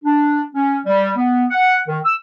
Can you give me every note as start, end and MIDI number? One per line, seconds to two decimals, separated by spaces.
0.04 0.42 62
0.55 0.78 61
0.86 1.11 55
1.17 1.45 59
1.50 1.79 78
1.88 1.99 51
2.05 2.15 88